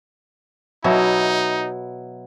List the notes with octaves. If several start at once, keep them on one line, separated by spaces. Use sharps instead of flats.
B2 F#3 D#4 E4